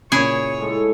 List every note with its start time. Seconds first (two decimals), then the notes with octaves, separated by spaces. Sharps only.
0.12 A#2 C#3 E4 G#4 C#5 G#5
0.60 A2 G#3 A4